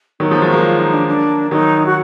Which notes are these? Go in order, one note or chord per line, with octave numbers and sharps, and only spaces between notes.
D#3 F#3 D#4
F3 G#3
F3 G#3 F#4
F#3 A#3
F4
D#4
D4
D4
D#3 F#3 D#4
F#4